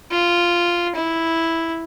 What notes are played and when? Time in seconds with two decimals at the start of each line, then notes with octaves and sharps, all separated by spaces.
0.11 F4
0.95 E4